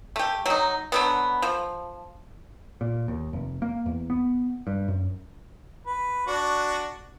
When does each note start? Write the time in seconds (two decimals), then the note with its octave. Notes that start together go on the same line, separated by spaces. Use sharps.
0.16 A3 G4
0.46 F#3 D#4
0.92 D3 F#3 B3
1.42 F3
2.81 A#2
3.08 D#2
3.33 F1
3.62 A#3
3.86 E2
4.10 B3
4.67 G2
4.88 F#2
5.86 B4
6.27 D4 F#4